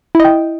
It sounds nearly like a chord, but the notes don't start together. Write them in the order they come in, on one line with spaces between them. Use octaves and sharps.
E4 D#5 G5